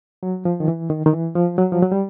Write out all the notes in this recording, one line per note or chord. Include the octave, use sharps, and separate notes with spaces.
F#3
F3
D#3
E3
D#3
D#3
E3
F3
F#3
F3
F#3
G3